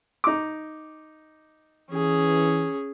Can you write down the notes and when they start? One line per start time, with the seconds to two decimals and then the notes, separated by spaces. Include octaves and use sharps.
0.24 D#4 D6
1.91 E3 C#4 G#4